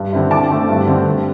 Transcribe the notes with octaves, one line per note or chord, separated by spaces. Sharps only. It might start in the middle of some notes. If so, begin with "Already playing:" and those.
Already playing: G2
D3 C4 E4
D3 A5 D6
A3 C4 E4
G2
D3 A3 C4
G2